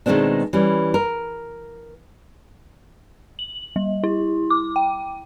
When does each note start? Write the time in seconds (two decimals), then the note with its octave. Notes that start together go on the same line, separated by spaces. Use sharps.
0.06 B2 D#3 G#3 A3 C4 D4
0.53 E3 G3 C#4
0.94 A#4
3.39 F#7
3.76 G3
4.04 E4
4.50 D6
4.76 G5